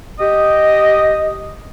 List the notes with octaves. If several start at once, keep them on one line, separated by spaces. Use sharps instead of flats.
G4 D#5